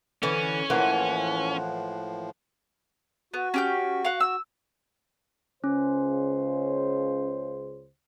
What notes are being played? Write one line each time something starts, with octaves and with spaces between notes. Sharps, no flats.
D3 E3 C#4
A2 E3 F3 A#3 F#5 C6
B3 F#4
C#4 G4 G6
F5 F#5
E6
C#2 C#3 C#4 C5